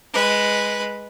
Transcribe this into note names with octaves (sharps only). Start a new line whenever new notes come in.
G#3 B4